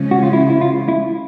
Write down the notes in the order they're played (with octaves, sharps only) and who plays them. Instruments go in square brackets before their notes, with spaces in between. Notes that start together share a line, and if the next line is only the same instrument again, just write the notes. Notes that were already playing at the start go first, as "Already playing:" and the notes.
Already playing: [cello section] C#3 F3 G#3 C#4
[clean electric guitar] F#4
F4
E4
E4
F4
E4